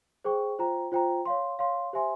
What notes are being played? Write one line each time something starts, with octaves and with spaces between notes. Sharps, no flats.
G#4 C5 G5 C#6
F4 C5 G5 A#5
F4 C5 G5 A#5
C#5 F5 C6
C#5 F5 C6
G4 C5 E5 G#5 C6